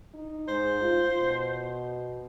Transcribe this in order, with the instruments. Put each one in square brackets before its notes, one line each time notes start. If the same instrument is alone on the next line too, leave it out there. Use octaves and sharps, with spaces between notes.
[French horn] D#4
[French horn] G#2 [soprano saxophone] C5
[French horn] F4
B2